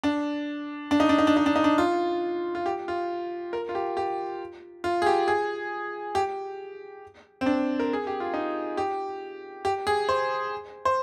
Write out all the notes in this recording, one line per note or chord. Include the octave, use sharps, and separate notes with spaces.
D4
D4
D#4
D4
D#4
D4
D#4
D4
D#4
D4
F4
F4
G4
F4
A#4
F4
G4
G4
F4
G#4
G4
G#4
G4
C4
D4
A#4
G#4
G4
F4
D#4
G4
G4
G#4
C5
C5